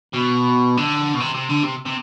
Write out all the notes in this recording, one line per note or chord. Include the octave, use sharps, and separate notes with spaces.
B2
D3
B2
C3
C3
D3
C3
C3